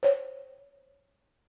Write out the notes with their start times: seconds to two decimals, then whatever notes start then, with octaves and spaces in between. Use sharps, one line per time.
0.03 C5 C#5